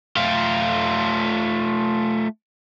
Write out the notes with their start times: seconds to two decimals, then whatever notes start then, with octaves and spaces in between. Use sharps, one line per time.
0.17 A3 F4